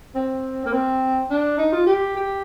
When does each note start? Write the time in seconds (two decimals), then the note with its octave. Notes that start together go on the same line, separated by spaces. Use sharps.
0.15 C4
0.65 A#3
0.72 C4
1.30 D4
1.58 D#4
1.72 F4
1.86 G4
2.16 G4